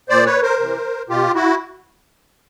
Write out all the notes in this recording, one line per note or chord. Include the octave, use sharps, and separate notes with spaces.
A#2 C5 D5
B4 C#5
A#4 C5
C3 E3
B2 F4 G4
E4 F#4